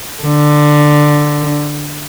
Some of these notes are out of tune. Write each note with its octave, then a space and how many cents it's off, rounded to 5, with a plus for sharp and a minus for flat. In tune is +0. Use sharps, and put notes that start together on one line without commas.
D3 +10